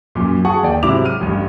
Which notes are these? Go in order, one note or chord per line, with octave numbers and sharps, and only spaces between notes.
F#2 A#2
F#4 G#4 F#5 A5 C#6
D#2 D5 G5
G#2 C3 F#3 E4 D6 F7
F6 D#7
A1 G2